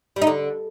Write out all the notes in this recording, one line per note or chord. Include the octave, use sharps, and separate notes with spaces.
G3
D#4
D3